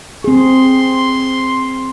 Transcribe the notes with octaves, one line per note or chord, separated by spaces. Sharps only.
C4 G#4 C6